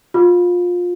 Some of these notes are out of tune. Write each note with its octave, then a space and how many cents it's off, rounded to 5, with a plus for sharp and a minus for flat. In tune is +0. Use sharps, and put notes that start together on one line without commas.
F4 +20